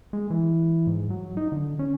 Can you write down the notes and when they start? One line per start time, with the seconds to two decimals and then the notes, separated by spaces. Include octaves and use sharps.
0.13 G#3
0.30 E3
0.87 G#2
1.10 F#3
1.37 D#4
1.52 D3
1.79 C#4